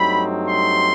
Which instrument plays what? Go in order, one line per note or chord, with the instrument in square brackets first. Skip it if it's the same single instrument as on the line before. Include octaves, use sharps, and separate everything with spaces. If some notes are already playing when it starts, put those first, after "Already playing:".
Already playing: [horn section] G2 F#3 A3 C4 D#4 B5
C6